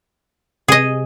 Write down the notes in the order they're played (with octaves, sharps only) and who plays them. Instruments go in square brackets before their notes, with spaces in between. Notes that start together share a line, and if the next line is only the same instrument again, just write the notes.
[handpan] C3 [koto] G#4 D#5